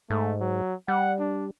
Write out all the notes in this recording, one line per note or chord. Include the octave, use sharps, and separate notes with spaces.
G#2 A3
F#3
G3 F#5
D4